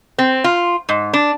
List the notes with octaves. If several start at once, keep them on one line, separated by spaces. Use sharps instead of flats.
C4
F4
G#2
D4